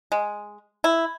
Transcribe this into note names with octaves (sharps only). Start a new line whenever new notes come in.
G#3
E4